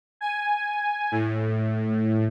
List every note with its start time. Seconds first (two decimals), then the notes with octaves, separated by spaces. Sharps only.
0.21 G#5
1.12 A2